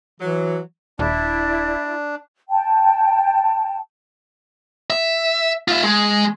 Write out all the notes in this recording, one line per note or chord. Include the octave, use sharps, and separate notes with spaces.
E3 F#3
D#1 D4 E4 D5
G5 A5
E5
F4 E5
G#3